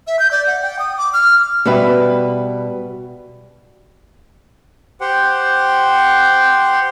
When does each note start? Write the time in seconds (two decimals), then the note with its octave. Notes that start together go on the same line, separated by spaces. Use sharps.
0.07 E5
0.19 G6
0.31 D5
0.47 F#5
0.62 G5
0.79 D#6
0.98 D6
1.13 F6
1.65 B2 G3 B4 E5
5.01 G4 C5 F#5 G5